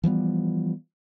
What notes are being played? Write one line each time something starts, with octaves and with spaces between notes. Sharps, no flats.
E3 F3 G3 B3